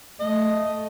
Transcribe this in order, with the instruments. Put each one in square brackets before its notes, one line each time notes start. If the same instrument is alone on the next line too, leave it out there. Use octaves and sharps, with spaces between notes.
[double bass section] A3 [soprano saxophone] D#5